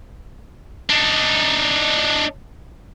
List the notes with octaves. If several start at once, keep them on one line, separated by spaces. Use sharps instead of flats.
D4 D#4